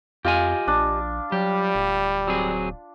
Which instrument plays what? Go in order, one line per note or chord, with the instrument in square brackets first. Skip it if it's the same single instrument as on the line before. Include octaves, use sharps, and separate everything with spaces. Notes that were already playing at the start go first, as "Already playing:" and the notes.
[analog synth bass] F2 [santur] F4 [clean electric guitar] G4 D#5 G#5
[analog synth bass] A#1 [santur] D4
[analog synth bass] F#3 [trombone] G3 [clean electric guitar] G4
[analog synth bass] D1
[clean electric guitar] F#3 C4 G#4